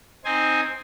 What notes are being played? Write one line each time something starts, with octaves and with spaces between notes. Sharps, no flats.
C4 D#4 C5 G#5